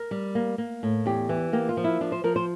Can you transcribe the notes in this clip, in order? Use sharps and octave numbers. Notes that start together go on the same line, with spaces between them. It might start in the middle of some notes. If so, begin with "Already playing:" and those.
Already playing: A#4
G3
A#3
A#3
A2
E2 G4
E3
A#3 G4
F4
F3
E4
F3 D4
C5
F3 A#4
C5